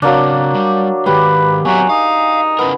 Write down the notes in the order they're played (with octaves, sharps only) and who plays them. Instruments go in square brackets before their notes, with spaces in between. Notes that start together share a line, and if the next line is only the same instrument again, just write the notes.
[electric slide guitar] C#3 C4 [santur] F#3 A#3 D4
[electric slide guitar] G3
[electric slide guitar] D#3 G#3 [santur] G4 [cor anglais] B4
[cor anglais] F#3 [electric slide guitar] B3 C4 E5 [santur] G#5
[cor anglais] D#4 [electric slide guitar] F5
[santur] B3 [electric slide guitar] C#4 E4 A#4